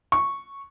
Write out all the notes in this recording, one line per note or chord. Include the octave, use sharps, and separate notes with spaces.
C#6